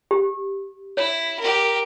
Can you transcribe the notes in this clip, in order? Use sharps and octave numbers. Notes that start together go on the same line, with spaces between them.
G4
E4 C#5
G4 A#4